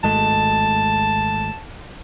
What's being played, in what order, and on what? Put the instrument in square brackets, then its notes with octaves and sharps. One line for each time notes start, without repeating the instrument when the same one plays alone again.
[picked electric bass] G#1 G#3 A3 [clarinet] A5